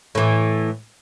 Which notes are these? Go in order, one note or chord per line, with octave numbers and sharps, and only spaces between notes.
A2 E3